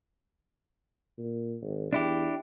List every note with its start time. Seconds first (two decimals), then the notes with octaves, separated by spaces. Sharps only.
1.18 A#2
1.62 G#1
1.93 E2 D4 E4 G4